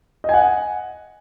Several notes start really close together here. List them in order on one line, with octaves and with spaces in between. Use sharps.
D#5 G#5 F#5